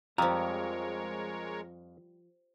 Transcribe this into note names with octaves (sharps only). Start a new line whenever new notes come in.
F2 F3 G3 G#3 A#4 C#5 A#5